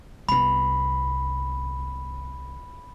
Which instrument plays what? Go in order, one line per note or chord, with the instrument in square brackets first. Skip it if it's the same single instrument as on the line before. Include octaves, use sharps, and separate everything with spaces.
[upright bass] C2 B3 [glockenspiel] B5